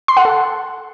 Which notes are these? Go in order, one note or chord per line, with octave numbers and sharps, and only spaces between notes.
C6
F#5
A4